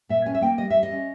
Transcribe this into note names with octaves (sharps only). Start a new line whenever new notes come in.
A#2 E5
C#4 G#5
E5
A#3 G5
G3 D#5
G3 E5
D#5
C#4